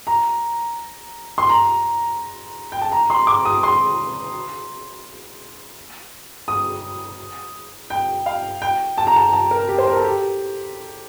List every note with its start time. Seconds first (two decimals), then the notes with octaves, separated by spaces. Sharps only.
0.07 A#5
1.38 C6
1.49 A#5
2.72 G5
2.82 A5
2.92 A#5
3.10 C6
3.27 D6
3.45 D#6
3.63 C6
6.48 D#6
7.90 G5
8.26 F5
8.62 G5
8.98 A5
9.07 A#5
9.16 A5
9.33 A5
9.51 A#4
9.69 G4
9.78 C5
9.87 A#4
9.96 A4
10.04 G4